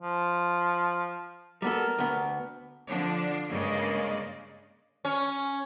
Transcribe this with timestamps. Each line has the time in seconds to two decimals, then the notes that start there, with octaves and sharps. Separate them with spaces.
0.01 F3
1.62 G3 B3 A4 A#4
1.98 D2 B3
2.88 D3 F3 D4
3.50 G2 C#3 G#3 A#3 D5 D#5
5.05 C#4